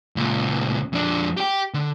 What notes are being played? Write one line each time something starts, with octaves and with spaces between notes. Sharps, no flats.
C#2 A#2
F2 D4
G4 G5
D3